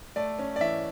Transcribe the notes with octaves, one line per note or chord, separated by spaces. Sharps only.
A3 D5
C#4
D5
E3 E5